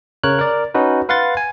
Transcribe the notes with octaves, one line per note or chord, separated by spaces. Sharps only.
C#3 A#4 C#5 F#6
A#4 D5
C#4 D#4 F#4 B4
B4 F5 F#5 C6 A6
G#5